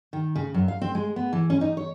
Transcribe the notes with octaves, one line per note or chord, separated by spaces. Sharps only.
D#3
C#3
F#2
F5
C4
G#3
B3
E3
C#4
D#4
C#5